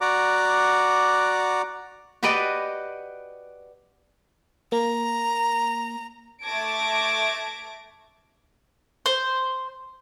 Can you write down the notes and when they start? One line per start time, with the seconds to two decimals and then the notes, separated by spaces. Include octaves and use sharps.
0.01 F#4 D5 F#5 A#5 D6
2.23 F#4 G4 B4 D5 D#5
4.72 A#3 A#5
6.43 A3 A5 D6 G#6 A#6 D7
9.06 C5